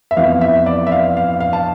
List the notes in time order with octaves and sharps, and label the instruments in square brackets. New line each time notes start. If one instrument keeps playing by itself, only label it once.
[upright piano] E5
[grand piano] F2 E3 B3 [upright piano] F5
[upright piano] E5
D5
E5
F5
F5
F5
A5